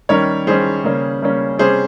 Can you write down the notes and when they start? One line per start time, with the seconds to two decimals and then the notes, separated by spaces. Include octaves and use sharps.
0.09 D#3 G3 C#4 A#4 C#5
0.47 D#3 G3 C#4 G#4 C5
0.84 C#3 G3 A#3 C#4
1.22 C#3 G3 A#3 C#4
1.59 C3 G3 C#4 G#4 C5